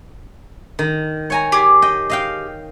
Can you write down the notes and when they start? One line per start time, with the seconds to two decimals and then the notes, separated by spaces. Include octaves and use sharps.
0.79 D#3
1.30 C#5 G#5 A#5
1.52 G4 G#4
1.82 D#5 G5
2.10 D#5 F5 G5